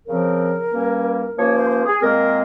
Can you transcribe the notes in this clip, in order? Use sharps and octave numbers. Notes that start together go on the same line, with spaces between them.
C#3 F3 C4 A#4
G2 G3 A#3 C#4
G2 F3 A#3 C#4 C#5
C5
C5
G#4
A#2 G#3 C4 A#4